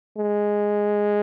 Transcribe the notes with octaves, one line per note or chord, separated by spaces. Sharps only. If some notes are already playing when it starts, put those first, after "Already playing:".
G#3